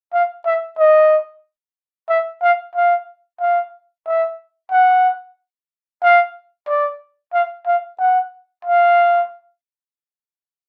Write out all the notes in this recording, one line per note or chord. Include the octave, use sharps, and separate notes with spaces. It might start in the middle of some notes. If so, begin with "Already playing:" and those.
F5
E5
D#5
E5
F5
F5
F5
E5
F#5
F5
D5
F5
F5
F#5
F5